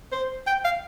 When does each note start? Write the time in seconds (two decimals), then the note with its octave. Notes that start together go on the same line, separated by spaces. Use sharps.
0.12 C5
0.47 G5
0.64 F5